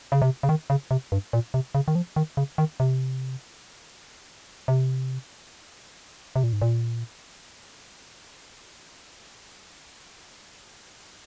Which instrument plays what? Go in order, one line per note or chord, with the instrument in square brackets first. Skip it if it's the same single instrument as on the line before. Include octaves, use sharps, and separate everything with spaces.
[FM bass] C#3
C3
C#3
D#3
C#3
C3
G2
A#2
C3
C#3
D#3
F3
D#3
C#3
D#3
C3
C3
C3
A#2
G#2
A#2